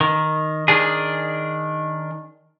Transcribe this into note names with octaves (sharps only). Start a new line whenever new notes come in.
D#3
D#3 D4 G#4